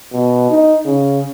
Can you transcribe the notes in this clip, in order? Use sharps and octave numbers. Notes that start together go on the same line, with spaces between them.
B2
D#4
C#3